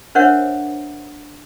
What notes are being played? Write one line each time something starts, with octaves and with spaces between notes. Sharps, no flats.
D4 A#4 C5 C#5 E5 F#5